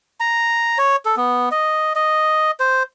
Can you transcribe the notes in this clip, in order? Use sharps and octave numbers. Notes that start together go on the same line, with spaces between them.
A#5
C#5
A4
B3
D#5
D#5
C5